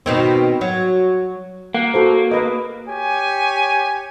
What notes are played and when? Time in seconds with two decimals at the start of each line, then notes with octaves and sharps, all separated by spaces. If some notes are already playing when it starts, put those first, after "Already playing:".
0.06 B2 D#3 C4
0.61 F#3
1.74 A#3 F#5
1.94 F#4 A4 C5
2.31 A#4 B4 D#5
2.88 G4 C#5 G#5